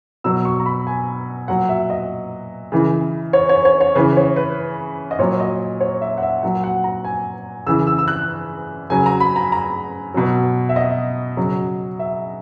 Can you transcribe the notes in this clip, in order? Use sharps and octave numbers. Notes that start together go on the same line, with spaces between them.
B2 F#3 E6
C#6
A#5
B5
G#5
A#2 F#3 F#5
E5
D#5
C#3 E3
C#5
C#5
C#5
C#5
C#3 E3 B4
C#5
B4
D#5
A#2 F#3 C#5
D#5
C#5
E5
F#5
E5
A#2 F#3 F#5
F#5
A#5
G#5
C#3 E3 E6
E6
E6
F#6
C#3 F#3 G#5
A#5
B5
A#5
A#5
B2 F#3
E5
D#5
C#3 F#3
E5